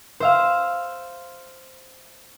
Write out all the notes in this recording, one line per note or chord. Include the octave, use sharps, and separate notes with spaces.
C5 E5 F5